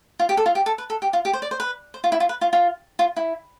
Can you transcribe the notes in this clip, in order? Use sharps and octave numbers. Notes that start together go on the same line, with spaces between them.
F4
G4
A4
F4
G4
A4
B4
A4
G4
F4
G4
C5
D5
C5
B4
C5
F4
E4
F4
B4
F4
F4
F4
E4